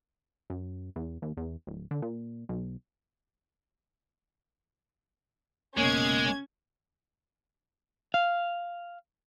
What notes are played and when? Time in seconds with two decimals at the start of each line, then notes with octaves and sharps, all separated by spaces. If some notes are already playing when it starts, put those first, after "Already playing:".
0.50 F#2
0.96 E2
1.22 D#2
1.37 E2
1.67 D1
1.91 D3
2.02 A#2
2.49 B1
5.77 F1 C#2 B2 F#3 G#3 A#3 C#4 G#6
8.14 F5